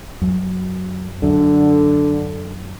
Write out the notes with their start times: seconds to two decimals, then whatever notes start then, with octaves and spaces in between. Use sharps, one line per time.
0.22 F#2 F#3
1.23 F#2 D3